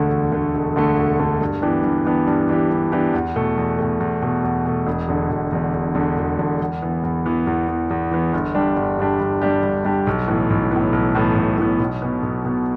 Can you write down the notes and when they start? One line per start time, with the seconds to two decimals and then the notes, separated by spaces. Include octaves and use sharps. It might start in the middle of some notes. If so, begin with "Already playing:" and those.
Already playing: E1 D2 D3 A3
0.10 E1
0.32 D2 D3 A3
0.55 E1
0.76 D2 D3 A3
0.97 E1
1.20 D2 D3 A3
1.41 G2
1.62 E3 B3 D4 G4
1.84 G2
2.05 E3 B3 D4 G4
2.27 G2
2.49 E3 B3 D4 G4
2.71 G2
2.92 E3 B3 D4 G4
3.14 E2
3.36 B2 A3
3.57 E2
3.79 B2 A3
4.00 E2
4.22 B2 A3
4.44 E2
4.65 B2 A3
4.87 E1
5.08 E2 D3
5.30 E1
5.52 E2 D3
5.74 E1
5.95 E2 D3
6.17 E1
6.39 E2 D3
6.61 E2
6.82 E3 B3
7.03 E2
7.26 E3 B3
7.47 E2
7.68 E3 B3
7.90 E2
8.11 E3 B3
8.33 G1
8.55 G2 G3 D4 G4
8.76 G1
8.98 G2 G3 D4 G4
9.20 G1
9.42 G2 G3 D4 G4
9.63 G1
9.85 G2 G3 D4 G4
10.07 B1
10.28 A2 E3 B3
10.50 B1
10.71 A2 E3 B3
10.93 B1
11.15 A2 E3 B3
11.37 B1
11.58 A2 E3 B3
11.80 B1
12.02 B2 B3
12.23 B1
12.45 B2 B3